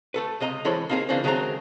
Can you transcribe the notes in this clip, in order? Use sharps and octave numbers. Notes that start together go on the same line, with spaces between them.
A3 A4 B4
C#2 C3 D#5 A#5
E3 G#3 A4 C5 C#5 B5
A#3 C4 D#4 G4 G#4 A#4
C#3 E3 F3 A#3 C4 D4
D#3 F#3 G#3 A3 C4 A#5